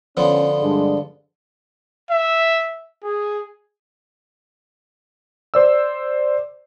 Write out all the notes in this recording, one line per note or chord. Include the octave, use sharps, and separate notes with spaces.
D3 F3 B3 C#4
G2 G#3 D4
E5
G#4
C5 D5 E6